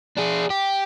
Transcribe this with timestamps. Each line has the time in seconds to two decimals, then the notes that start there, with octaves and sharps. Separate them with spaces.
0.17 D4 G#4
0.50 G4